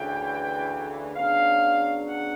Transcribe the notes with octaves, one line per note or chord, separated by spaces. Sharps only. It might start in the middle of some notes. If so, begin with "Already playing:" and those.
Already playing: D2 C#3 E3 G5
C#3 F#3 B3 D4 F5
F#5